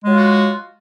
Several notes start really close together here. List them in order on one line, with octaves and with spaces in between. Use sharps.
G#3 F#3 F4 F#4